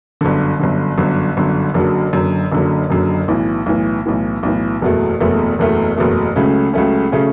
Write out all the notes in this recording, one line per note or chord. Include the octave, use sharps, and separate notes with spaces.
G1 F#2 D3
G1 F#2 D3
G1 F#2 D3
G1 F#2 D3
F#1 F#2 D3 F#3
F#1 F#2 D3 F#3
F#1 F#2 D3 F#3
F#1 F#2 D3 F#3
B1 A2 E3
B1 A2 E3
B1 A2 E3
B1 A2 E3
F#1 E2 B2 A3
F#1 E2 B2 A3
F#1 E2 B2 A3
F#1 E2 B2 A3
C#2 C#3 F#3 A3 C#4
C#2 C#3 F#3 A3 C#4
C#3 F#3 A3 C#4